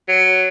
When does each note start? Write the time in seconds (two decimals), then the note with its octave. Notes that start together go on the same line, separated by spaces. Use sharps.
0.08 F#3